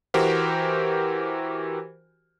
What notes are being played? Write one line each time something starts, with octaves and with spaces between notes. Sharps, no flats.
E3 F#4 G4 A#4 C5